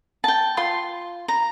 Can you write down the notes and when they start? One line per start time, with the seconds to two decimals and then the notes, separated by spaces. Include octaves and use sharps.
0.24 G5 A5
0.57 F4 C6
1.28 A#5